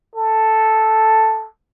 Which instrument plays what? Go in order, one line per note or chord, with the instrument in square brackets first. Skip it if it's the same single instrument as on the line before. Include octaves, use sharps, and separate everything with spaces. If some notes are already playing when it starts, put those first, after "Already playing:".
[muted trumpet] A4